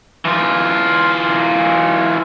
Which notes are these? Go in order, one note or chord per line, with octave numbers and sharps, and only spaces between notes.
E3 F4